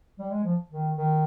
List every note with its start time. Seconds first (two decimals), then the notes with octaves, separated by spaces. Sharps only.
0.19 G3
0.31 G#3
0.45 F3
0.71 D#3
0.97 D#3